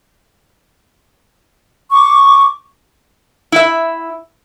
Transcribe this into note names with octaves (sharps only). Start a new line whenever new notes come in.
C#6 D6
E4 E5